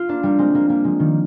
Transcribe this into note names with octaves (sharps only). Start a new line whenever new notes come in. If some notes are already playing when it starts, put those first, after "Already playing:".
Already playing: F4
A#3 D4
G3 A#3
G#3 C4
G3 A#3
G3 A#3
F3 G#3
D#3 G3